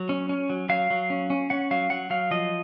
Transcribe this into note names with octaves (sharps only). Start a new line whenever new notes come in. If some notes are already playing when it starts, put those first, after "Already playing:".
Already playing: F#3
C#4
C#4
F#3
F#3 F5
F#3
C#4
C#4
C#4 F#5
F#3 F5
F#3 F#5
F#3 F5
F3 D#5